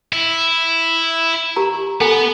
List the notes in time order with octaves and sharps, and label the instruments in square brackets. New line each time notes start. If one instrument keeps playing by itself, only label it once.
[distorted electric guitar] E4
[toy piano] G4 A#5
[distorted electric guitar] B3 [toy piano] A4 G#5